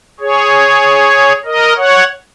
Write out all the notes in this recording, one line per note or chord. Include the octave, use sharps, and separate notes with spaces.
G#4 C#5
A#4 D#5
C#5 F#5